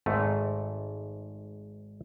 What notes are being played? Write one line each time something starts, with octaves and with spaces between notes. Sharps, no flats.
G#1 G#2 A3 D#5